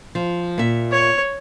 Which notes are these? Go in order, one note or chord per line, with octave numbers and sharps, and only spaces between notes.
F3
A#2 E5
C#5